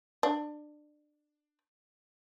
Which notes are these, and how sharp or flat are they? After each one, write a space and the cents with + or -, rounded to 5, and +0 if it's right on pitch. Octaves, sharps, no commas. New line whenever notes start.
D4 +25